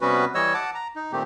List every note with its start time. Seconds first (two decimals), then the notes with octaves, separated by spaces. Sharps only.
0.01 C3 G3 B3 C#4 F#4 B4
0.35 E3 G3 C#5 D#5 E6
0.54 F#5 A5 D6
0.74 A#5
0.96 D#4
1.12 A#2 D#3 A3 C4 G4